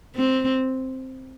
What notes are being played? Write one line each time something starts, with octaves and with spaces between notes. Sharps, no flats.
C4